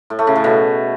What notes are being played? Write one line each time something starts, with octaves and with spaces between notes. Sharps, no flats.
A2
A3
C#3
A2
B2